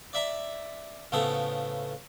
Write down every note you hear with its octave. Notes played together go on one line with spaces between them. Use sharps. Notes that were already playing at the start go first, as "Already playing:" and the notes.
D5 E5 A#5
A2 C#3 F3 B3 A4